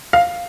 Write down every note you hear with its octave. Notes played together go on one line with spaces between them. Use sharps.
F5